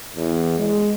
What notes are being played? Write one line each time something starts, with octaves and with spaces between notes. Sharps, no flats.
E2
G#3